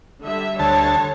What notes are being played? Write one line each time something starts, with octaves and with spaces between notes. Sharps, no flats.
D3 G3 E5
D2 C#5 A5